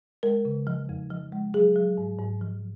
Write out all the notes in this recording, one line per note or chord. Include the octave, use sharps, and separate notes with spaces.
G#3 A#4
C#3
F3
F2
F3
G#3
F#3 G#4
F#3
G#2
G#2
F3